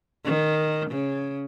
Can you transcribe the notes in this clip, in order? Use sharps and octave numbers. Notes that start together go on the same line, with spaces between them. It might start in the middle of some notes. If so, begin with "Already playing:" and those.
D#3
C#3